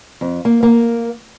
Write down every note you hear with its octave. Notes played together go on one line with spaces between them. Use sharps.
F2
A#3
A#3